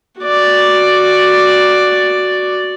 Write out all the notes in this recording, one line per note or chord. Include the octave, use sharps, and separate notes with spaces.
F#4 D5